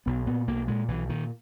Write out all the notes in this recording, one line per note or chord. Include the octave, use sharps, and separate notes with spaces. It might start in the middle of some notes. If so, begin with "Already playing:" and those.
B1 B3
A#2 B3
B1 A#3
A#2 G#3
B1 E3
A#2 D#3